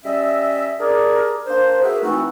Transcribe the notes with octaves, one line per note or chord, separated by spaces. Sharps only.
G3 C#4 D#5 E5
D4 G4 G#4 A#4
A#3 D4 C5
F#4 G#4 A#4 B4 E5
E3 A3 C4 D#4 F#4